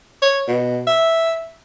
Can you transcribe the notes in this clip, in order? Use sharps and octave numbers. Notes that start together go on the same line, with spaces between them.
C#5
B2
E5